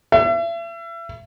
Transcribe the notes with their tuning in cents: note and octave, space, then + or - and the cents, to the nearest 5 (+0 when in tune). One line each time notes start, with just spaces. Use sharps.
E5 +35